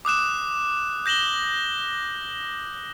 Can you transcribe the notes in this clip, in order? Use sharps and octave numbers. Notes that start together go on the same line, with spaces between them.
D6 D#6 F#6 E7
G6 A#6 E7 F#7 G7